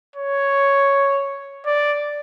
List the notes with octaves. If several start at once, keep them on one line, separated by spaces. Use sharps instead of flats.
C#5
D5